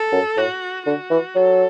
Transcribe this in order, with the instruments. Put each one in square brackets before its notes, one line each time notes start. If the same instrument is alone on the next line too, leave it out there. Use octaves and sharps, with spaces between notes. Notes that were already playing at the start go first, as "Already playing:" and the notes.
Already playing: [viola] A4
[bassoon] F#2
[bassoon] A2 [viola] F#4
[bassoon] D3 [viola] F#4
[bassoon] E3
[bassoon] F#3 [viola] A4